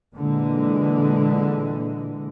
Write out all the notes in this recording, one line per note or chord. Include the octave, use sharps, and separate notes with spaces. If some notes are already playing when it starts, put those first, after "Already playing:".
A#2 D3 E3 G#3